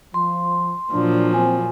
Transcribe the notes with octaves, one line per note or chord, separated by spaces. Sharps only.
F3 C6
A#2 F3 F#3 D4
C4 G#5